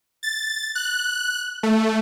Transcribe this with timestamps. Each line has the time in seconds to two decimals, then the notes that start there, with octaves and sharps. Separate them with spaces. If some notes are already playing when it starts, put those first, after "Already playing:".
0.23 A6
0.75 F#6
1.63 A3